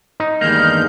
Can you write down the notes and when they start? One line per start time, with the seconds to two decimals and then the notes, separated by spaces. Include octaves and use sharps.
0.20 D#4
0.41 E2 G2 D#3 G#3 A#3 F6 G6